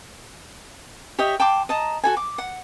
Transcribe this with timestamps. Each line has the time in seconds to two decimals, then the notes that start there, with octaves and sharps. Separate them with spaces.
1.19 G4 C#5 D#5 E5
1.40 G5 A5 C6 D6
1.69 D#5 A5 A#5
2.04 F#4 A4 G#5
2.17 D6
2.38 F#5